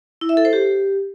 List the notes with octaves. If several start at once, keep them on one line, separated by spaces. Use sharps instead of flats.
E4
E5
A4
C5
G4